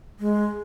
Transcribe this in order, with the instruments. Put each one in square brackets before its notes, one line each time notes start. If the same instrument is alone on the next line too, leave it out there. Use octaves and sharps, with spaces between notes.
[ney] G#3